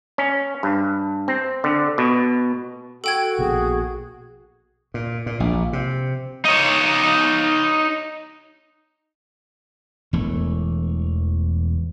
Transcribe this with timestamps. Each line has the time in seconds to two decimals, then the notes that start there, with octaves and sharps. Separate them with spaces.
0.18 C#4
0.63 G2
1.28 C4
1.64 D3
1.98 B2
3.04 F#4 A4 G5 G#6
3.38 A#1 B2 G#4
4.94 A#2
5.26 A#2
5.40 A#1
5.73 C3
6.45 D#4 C#5
10.13 E1 E3 A3